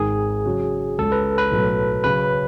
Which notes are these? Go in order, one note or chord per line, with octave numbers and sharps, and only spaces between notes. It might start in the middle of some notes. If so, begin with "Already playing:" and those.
Already playing: G#1 G#2 D#3 G#3 G#4
C#3 F#3 C#4 F#4
C#2 C#3 G#3 A4
B4
B4
B1 A2 F#3
C#3 F#3 C#4 G#4 B4